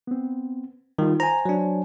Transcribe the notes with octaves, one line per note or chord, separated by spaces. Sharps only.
B3 C4
D#3 G3 F4
C5 G#5 A#5
F#3 D4